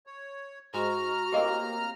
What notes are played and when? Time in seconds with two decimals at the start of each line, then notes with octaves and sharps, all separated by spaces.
0.07 C#5
0.74 G#2 G#3 F#4 A#5 F6
1.32 A2 A#3 C4 G4 D#5